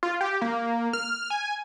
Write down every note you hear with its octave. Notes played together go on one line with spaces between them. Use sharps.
F4
G4
A#3
F6
G#5